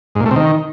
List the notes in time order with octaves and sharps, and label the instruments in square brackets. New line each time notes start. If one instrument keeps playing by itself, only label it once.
[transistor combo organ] G#2
A#2
A3
C3
D#3